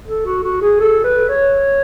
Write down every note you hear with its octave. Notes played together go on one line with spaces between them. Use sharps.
A4
F#4
F#4
G#4
A4
B4
C#5